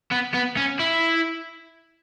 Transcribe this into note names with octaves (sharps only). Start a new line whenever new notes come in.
B3
B3
C#4
E4